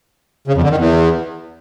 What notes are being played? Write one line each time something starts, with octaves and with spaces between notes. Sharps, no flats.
C#3
F2
D3
D#3
E2